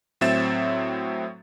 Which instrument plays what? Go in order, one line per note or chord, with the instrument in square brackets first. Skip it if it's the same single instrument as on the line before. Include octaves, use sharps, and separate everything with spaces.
[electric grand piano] A2 F#3 C4 E5 A6 E7